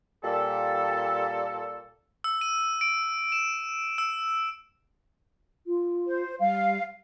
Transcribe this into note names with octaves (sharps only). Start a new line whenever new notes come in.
A#2 G3 A4
E6
D#7
D7
E7
E6
F4
C5
G3 F5